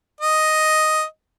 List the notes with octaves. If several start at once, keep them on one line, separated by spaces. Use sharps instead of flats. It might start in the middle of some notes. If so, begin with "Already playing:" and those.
D#5